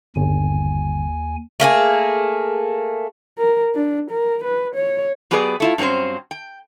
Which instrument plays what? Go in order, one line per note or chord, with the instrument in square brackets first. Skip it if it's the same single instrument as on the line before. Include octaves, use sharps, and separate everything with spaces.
[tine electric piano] G1 [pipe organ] D#2 G#5
[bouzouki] A3 A#3 D4 G#4
[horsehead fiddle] A#4
D4
A#4
B4
C#5
[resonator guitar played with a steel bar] F#3 B3 G4 G#4 B4 D5
A3 E4 F4
G2 F#3 C4 C#4 C5
G5